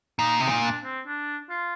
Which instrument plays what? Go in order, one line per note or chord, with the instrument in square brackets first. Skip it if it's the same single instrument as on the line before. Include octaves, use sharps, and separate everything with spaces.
[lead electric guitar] A#2 [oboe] D#4
[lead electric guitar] C3 [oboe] D#4
[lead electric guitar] A#2
[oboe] D4
C4
D4
F4